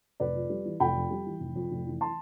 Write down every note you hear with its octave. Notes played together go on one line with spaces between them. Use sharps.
F1 B4 D5
F2
G3
E3
F1 G5 B5
F2
G3
E3
F1
F2
F1
E3
A5 C6